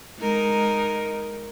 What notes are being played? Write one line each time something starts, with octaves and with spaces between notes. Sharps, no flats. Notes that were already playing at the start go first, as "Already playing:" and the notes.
G#3 D#4 A#4